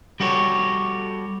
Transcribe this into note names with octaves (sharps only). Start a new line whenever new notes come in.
G3 F#4 G4 A4 C#5